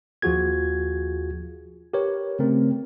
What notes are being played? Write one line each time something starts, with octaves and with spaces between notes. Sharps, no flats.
D#2 F3 F4 F#4 G#4 G#6
G4 A#4 B4 C#5
C#3 A3 C4 A#4